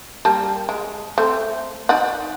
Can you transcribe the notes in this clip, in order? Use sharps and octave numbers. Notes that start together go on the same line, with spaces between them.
G3 A#3 A5
G#3
A3 C4
D#4 D5 F#5